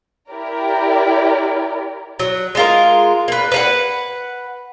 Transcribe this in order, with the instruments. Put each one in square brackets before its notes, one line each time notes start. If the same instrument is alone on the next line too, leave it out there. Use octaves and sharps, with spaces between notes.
[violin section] E4 G4 A#4 D5
[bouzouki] F#3
G#3 F4 A#4
A#3 B4
B4 F5 F#5